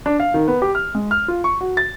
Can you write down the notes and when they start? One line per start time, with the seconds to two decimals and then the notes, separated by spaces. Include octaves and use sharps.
0.06 D4
0.20 F5
0.34 D#3
0.48 B3
0.62 G4
0.75 F6
0.95 G#3
1.11 F6
1.28 F4
1.44 C#6
1.61 F#4
1.77 A6